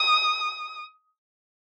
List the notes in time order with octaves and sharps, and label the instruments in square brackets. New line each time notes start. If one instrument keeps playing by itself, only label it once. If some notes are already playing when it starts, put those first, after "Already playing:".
Already playing: [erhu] D#6